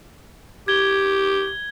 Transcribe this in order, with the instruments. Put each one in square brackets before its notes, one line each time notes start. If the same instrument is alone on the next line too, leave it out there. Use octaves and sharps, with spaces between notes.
[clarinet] G4 [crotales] G#6 G7